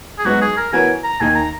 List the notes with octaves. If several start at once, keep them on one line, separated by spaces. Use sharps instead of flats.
G#4
G#2 F#3 B3 D#4 F#4
G#4
A#4
E3 B3 F#4 A#4 C#5 G#5
A#5
D#2 D#3 A#3 D#4 G#5
A#5